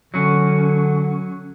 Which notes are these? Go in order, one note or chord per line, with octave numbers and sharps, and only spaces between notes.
D3 F#3 C#4